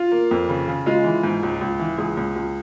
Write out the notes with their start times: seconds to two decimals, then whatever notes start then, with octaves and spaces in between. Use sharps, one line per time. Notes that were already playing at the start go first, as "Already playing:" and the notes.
Already playing: F4
0.12 A#3
0.31 F2
0.49 C#3
0.68 C#3
0.86 G#3 F4
1.05 E3
1.23 G#2
1.43 C#2
1.61 C#2
1.80 E3
1.98 C#2 G#4
2.17 C#2
2.36 C#2